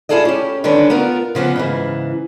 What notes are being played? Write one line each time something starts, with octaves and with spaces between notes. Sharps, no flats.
E4 F4 G#4 A4 D5 D#5
C#4 G4
D3 D#3 G3 C#4 D4 B4
B3 F4 A#4
C#3 F3 A#3 B3
G#2 C#3 E3